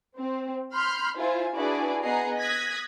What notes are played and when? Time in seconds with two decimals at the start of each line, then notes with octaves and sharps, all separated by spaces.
0.17 C4
0.74 B5 C6 F6 G6
1.18 E4 F4 C5 G#5
1.54 D4 E4 F#4 G#4 B4 D5
2.03 B3 G#4 D#5 F#5 A#5 C7
2.39 D#6 F#6 G#6 A#6 B6